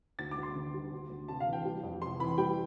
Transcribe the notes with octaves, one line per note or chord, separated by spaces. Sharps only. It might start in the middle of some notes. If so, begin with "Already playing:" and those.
D2 A6
D6
D2
C6
D3
G3
D2
D2
C3 A5
F5
E3
G5
G3
F2
C3 C6
E3 B5
G3 G5